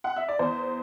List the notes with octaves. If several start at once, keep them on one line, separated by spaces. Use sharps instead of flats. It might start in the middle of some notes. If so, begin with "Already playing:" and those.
F#5
E5
D5
E2 C5